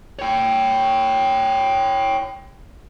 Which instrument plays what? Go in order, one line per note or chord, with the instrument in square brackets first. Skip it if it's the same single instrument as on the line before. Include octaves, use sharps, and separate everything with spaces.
[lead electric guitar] C#5 G5